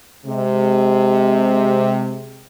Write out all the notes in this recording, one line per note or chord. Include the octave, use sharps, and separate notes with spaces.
C3 G#3